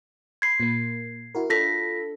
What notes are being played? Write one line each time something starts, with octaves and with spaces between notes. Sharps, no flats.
B5 C6 G#6 C7
A#2 A#3
E4 F#4 A#4
D4 F4 A4 A#6 B6